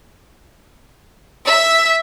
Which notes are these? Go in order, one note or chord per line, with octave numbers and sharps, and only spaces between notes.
E5 E6